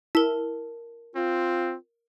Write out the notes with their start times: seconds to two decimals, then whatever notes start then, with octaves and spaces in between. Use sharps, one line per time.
0.15 E4 A#4 A5
1.16 C4 F4